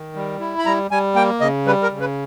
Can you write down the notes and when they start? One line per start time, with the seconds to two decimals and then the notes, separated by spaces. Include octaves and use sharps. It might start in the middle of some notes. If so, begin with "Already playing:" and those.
Already playing: D#3
0.15 G3
0.40 E4
0.59 B5
0.65 G3 A#5
0.91 G3 G#5
1.15 A#3 G5
1.40 C#3 D#5
1.66 G3 B4
1.83 A#4
1.91 C#3
2.00 B4